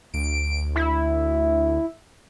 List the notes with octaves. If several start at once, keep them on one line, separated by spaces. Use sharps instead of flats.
D2 D7
E4